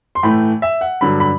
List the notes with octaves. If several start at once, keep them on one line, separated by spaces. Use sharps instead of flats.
C6
A2 E3 A3 B5
E5
F#5
G2 D3 F#3 B5
B5